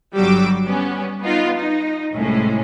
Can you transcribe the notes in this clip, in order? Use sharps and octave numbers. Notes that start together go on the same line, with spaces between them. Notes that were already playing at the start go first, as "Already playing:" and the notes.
G1 F#3 G3 G4 D6 E6
G3 B3 C#4
B3 D#4 F4
D#4
C2 A2 G#3 C#4